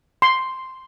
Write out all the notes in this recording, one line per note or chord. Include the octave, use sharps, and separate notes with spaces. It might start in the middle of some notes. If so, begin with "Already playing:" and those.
C6